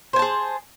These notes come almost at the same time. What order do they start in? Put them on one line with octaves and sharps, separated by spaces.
C5 G#5 A5 G#4